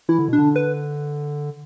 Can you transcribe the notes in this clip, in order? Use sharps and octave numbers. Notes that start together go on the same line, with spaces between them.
E3 E4
D3
B2 D4
D3
B4